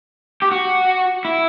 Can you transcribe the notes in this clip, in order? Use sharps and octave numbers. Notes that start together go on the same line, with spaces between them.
G4
F#4
E4